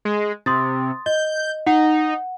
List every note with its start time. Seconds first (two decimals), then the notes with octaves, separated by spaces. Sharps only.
0.05 G#3
0.46 C3 C6 D#6 A6
1.06 D#5 G6
1.66 D#4 F#5